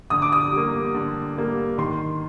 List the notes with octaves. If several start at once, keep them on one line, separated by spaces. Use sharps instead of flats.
D3 D#6
D6
D#6
G3 A#3
D3
G3 A#3
D#3 C6